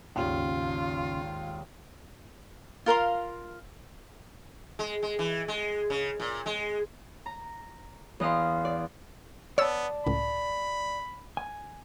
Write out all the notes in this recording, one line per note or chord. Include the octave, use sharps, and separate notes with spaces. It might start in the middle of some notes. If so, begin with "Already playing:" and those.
G#1 D#2 C#3 C#4 F4 F#5
F4 A#4 F5 C6
G#3
G#3
E3
G#3
C#3
A#2
G#3
A#5
E2 D#5 F5 C6
D5
B3 C#5 D5 A5 E6
C#2 A2 B5
G#5